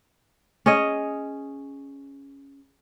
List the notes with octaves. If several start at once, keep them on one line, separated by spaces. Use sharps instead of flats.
C#4 G#4 C#5 D#5